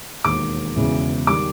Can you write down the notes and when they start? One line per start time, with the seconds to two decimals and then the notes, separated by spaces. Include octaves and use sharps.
0.24 E1 D#2 D#3 D6
0.76 E1 E2 C#3 E3
1.27 D#3 G3 D6